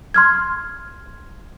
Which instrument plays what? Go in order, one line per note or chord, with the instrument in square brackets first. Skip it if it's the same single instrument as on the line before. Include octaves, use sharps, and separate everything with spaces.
[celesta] C6 F6 G#6